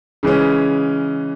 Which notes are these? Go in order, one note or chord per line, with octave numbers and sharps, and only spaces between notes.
C#3 E3 G#3 C#4